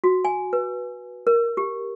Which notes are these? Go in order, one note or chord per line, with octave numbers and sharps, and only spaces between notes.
F#4
G#5
B4
A#4
G4